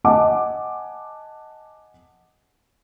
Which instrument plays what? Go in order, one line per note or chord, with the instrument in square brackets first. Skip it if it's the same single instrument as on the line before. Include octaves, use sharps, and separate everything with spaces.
[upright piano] D#5 F#5 G#5 A5 D6